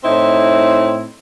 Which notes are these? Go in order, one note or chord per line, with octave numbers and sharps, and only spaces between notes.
A2 C4 D#4 E4